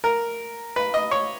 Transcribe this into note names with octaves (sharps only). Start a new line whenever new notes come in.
A#4
B4
D#5
C#5